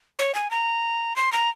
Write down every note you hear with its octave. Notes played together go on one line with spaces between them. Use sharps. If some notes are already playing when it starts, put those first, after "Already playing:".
C#5
G#5
A#5
C6
A#5